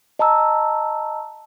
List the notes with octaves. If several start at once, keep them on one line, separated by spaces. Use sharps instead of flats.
D#5 A5 A#5 E6